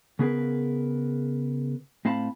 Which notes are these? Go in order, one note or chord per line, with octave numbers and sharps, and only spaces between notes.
C#3 B3 G#4 A#4 B4
A2 C4 F5 A5 B5